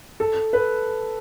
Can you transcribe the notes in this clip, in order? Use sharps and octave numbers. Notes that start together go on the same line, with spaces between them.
A4
B4